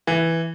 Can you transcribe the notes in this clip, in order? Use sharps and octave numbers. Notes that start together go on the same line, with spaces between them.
E3